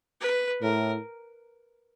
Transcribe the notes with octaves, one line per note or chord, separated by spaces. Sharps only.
B4
A2 A#4